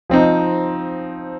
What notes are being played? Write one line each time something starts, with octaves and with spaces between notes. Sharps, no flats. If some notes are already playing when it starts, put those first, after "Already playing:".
F3 C4 D#4